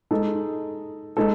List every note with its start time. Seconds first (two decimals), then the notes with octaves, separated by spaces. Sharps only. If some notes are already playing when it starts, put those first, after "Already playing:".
0.11 G#3 D#4 A4
1.17 G#3 D#4 A4